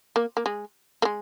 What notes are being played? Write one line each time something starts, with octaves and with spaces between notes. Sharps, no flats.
A#3
A#3
G#3
A#3
G#3